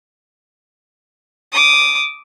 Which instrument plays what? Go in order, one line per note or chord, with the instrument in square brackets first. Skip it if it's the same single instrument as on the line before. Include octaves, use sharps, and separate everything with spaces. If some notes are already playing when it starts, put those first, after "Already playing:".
[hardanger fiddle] D6 D#6